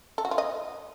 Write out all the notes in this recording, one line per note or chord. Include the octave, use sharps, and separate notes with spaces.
A4
F#4
F4
D#5